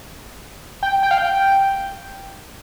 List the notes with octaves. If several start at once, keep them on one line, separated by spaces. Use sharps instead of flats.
G5
G5
F5
G5